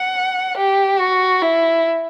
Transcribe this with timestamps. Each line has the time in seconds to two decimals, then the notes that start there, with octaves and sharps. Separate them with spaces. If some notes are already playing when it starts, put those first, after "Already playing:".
Already playing: F#5
0.57 G4
1.00 F#4
1.42 E4